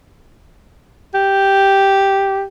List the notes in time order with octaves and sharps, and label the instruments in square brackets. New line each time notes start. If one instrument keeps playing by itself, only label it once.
[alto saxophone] G4